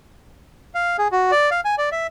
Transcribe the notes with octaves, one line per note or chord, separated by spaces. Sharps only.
F5
G#4
F#4
D5
F5
G#5
D5
E5